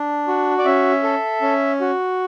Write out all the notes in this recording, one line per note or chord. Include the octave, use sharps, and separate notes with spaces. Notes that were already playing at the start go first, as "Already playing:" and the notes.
Already playing: D4
F#4
D5
C#4 E5
A4
C#4
F#4